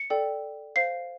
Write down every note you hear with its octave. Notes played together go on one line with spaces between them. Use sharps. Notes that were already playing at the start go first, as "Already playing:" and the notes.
Already playing: C#7
A4 D5 G5
C5 F5 C7